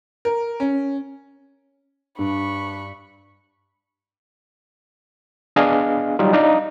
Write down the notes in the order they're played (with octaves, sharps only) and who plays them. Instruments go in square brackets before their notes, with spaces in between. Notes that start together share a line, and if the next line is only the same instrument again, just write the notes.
[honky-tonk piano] A#4
C#4
[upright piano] G2 [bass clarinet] D4 [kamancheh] B5 C#6
[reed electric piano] B3 D4 G#4 D#5 F5 G#5
F#3 G3 D#4 F4
D4 D#4 D5 F5